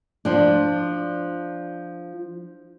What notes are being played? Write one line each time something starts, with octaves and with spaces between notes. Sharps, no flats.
F3 D4